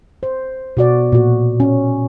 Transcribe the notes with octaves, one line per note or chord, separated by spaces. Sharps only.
C5
B2 F#4 D5
A#2 F#4
C#4